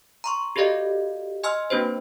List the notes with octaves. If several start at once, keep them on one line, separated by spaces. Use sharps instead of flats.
A#5 C6 C#6
F#4 G4 A4 D5 D#5 F5
D#5 G#5 C6 E6 F6
A#3 C4 D4 F#4 B4 C5